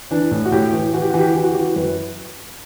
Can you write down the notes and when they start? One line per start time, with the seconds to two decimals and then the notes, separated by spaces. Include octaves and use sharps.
0.11 E3 D4
0.31 A2
0.46 F#4
0.52 A2 G4
0.73 E3
0.93 E3 F#4
1.02 G4
1.10 E3 F#4
1.19 G4
1.27 F#4
1.35 E3 G4
1.44 F#4
1.52 G4
1.56 E3
1.61 F#4
1.76 F#2 B4